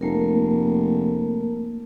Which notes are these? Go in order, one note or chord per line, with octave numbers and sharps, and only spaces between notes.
F1 A3 A#3 A#4